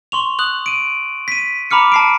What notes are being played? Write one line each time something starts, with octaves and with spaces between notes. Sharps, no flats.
C6 C#6 F7
D#6 F#6 F#7
D7 D#7
B6 D#7
A#5 B5 D6 F6 C#7
A5 C7 D7